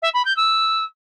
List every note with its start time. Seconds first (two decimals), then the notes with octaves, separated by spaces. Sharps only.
0.02 E5
0.14 B5
0.25 G6
0.37 E6